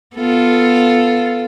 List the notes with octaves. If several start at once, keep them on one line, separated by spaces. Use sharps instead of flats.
B3 F4 A4